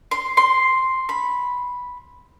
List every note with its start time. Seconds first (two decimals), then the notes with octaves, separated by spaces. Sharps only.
0.11 C6
0.37 C6
1.09 B5